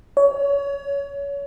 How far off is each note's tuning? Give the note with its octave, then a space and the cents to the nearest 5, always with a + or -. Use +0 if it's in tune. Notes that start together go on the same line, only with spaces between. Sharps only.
C#5 +25